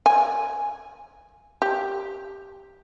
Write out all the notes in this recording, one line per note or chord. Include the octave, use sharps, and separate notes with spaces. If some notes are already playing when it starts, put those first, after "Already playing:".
G#5
G4